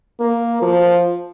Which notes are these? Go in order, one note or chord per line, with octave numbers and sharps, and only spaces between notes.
A#3
F3